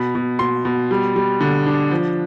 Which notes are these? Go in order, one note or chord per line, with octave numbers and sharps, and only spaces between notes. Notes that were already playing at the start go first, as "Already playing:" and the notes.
Already playing: B2 B5
B2
B2 C6
B2
G3
G3
D3
D4
F3